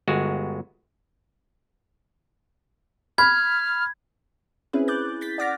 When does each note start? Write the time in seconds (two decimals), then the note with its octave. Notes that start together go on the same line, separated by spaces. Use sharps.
0.08 G1 G#3 F#4
3.18 B5 F6 G#6
4.73 C4 C#4 E4 G#4 B4
4.88 D6 F#6 G6 A6
5.21 G6 A6 B6
5.38 D5 F#5 D6 F6 A6 A#6